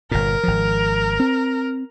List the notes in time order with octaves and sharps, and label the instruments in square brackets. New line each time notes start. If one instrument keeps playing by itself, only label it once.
[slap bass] G1 A#2 [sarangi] A#4
[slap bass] G#1 F3
C4